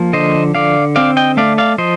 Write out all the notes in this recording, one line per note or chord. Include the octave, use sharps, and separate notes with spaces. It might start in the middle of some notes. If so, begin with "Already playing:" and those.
Already playing: F3 A#3
D3 C5 D#5
D3 D5 F5
C4 D5 F5
D#5 G5
A3 D5 F5
D5 F5
F3 C5 D#5